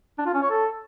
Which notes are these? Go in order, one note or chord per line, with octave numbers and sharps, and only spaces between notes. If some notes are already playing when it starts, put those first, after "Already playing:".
D4
F4
C#4
C#5
A4